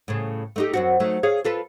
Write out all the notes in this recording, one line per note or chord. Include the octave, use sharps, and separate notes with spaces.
A2 C#3
A3 D#4 G4
F#2 C4 F#4
F#3 A3 D#4
G#4 C#5 F5
F4 A4 B4